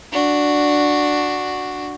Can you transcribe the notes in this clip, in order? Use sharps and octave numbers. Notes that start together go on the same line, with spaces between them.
D4 F#4